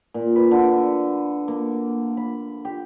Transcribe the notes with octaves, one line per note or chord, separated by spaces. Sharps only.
A#2
B4
D3
A#3
B5
G4